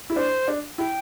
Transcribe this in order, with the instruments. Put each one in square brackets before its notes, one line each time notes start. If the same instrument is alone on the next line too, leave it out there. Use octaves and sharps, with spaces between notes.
[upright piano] E4
[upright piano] D4 [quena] C5
[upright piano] D4
[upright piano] E4 [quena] G5